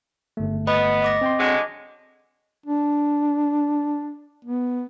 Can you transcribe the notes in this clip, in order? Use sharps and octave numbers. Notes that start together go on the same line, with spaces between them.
G1 A3
B3 D#5 B5
D#5 D6 A#6
C4 G5 C6
D3 F#3 G#3
D4
B3